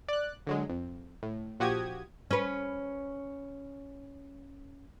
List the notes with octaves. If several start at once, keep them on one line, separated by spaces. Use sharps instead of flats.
D5 F#6
D3 F#3 G#3
F2
A2
A#1 F3 F#4 G4 D#6 G#6
C#4 B4